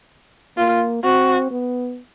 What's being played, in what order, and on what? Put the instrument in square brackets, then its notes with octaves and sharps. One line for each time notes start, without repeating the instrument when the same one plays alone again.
[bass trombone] A#3 [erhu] F4
[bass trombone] C4 [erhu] F#4
[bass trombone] B3